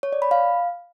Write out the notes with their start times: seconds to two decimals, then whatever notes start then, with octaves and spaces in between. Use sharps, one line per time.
0.03 C#5
0.12 D5
0.22 B5
0.31 F5